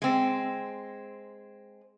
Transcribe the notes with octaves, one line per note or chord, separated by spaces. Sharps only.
G#3 C4